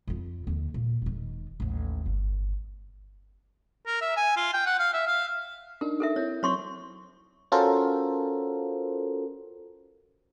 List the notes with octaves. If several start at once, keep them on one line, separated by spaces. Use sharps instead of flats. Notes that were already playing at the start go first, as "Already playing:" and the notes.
F2 F4
D#2 D3
A#2
E1 D#3
A1 D#2
G1
A#4
E5
G#5
F4
G5
F#5
F5
E5
F5
D4 D#4 A#4
A4 A#4 E5
C4 E4 C#5
F#3 C4 C#5 C6 C#6
C#4 F4 F#4 A4 A#4 C5